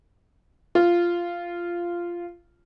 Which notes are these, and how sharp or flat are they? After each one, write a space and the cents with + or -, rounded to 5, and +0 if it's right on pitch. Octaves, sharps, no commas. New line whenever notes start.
F4 -10